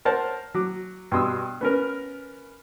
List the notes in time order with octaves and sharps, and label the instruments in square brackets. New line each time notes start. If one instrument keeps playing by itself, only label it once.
[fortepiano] A#4 C5 C#5 F#5 A5
F#3 D6
G2 B2 C6 D#6 E6
B3 C#4 A#4